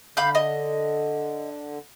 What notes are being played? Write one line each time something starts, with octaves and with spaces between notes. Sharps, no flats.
D3 F5 B5 G6
D#5